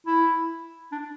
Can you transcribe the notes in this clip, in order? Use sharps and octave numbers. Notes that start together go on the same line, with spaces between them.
E4
D4